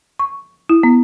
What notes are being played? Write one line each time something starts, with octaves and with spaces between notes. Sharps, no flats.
C#6
E4
B3